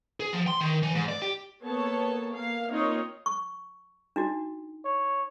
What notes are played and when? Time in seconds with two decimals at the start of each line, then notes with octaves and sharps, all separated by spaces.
0.20 G#4
0.32 F3
0.48 C6
0.61 D#3
0.83 E3
0.95 G#2
1.09 D5
1.22 G4
1.63 A#3 B3 A4 C#5 A5
2.33 A#3 F5
2.70 A#3 C4 D#4 F4 C#5 D#5
3.26 C#6
4.16 D4 D#4 F#4
4.85 C#5